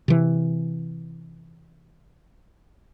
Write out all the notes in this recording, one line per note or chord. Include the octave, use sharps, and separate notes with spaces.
C3 E3